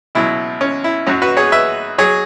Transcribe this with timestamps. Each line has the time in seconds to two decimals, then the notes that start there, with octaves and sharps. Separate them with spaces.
0.15 C#2 B2 F#3 E4
0.61 C#4
0.84 E4
1.07 F#2 F#3 C#4 F#4
1.22 F#4 B4
1.37 G#4 C#5
1.52 B4 E5
1.98 F#3 G#4 C#5